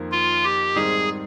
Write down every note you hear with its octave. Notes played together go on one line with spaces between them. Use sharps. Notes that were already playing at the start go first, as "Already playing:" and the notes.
Already playing: F2 D#3 A#3
F4
G4
G#2 D#3 G3 C4 D#4 G#4